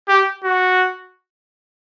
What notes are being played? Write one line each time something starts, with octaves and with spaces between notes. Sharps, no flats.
G4
F#4